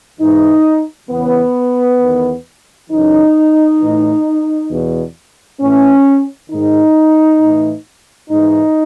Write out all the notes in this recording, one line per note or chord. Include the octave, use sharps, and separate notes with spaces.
G#2 E3 D#4
E2 C#3 E3 B3
E2 D#3
F#2 C#3 E3 D#4
A2 E3
E2 B2
A2 E3 C#4
G#2 D#3 D#4
A2 E3
G#2 E3 D#4